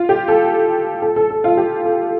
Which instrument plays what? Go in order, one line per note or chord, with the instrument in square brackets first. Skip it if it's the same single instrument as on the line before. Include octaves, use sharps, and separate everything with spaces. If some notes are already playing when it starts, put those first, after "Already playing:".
Already playing: [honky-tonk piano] F4
G4
A4
A4
A4
A4
F4
G4
A4